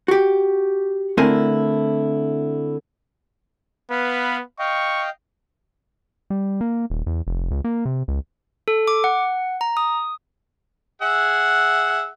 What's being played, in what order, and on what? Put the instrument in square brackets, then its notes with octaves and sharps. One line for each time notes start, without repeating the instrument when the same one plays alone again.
[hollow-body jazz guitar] F#4 G4
D3 A3 C4 E4 A#4 G#5
[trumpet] B3 [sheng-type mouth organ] B4 F5 B5
[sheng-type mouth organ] D#5 F5 G5 [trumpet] C#6
[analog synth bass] G3
A#3
D#1
E2
F1
C#2
A#3
C3
C#2
[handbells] A4
D6
F#5
A#5
D#6
[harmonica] G#4 E5 F#5